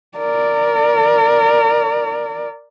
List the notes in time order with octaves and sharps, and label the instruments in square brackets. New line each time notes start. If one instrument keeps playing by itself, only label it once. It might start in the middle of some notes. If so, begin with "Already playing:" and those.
[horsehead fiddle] A#4 D5